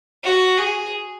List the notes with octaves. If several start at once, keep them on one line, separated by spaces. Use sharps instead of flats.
F#4
G#4